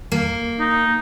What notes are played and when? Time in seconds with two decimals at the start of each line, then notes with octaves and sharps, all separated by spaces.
0.12 A#3
0.60 D#4